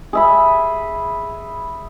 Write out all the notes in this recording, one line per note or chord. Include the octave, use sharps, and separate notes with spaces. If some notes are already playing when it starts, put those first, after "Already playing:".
G#4 E5 B5